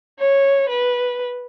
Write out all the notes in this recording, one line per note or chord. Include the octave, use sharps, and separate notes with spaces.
C#5
B4